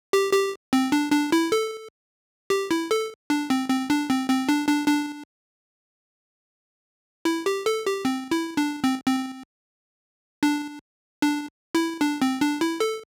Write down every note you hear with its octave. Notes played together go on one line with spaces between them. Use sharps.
G4
G4
C4
D4
D4
E4
A4
G4
E4
A4
D4
C4
C4
D4
C4
C4
D4
D4
D4
E4
G4
A4
G4
C4
E4
D4
C4
C4
D4
D4
E4
D4
C4
D4
E4
A4